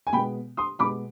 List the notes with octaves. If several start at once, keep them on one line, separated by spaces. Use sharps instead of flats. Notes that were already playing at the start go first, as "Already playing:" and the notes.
G#5
B2 G#3 B3 G5 B5
C6 D#6
B2 G#3 B3 B5 D6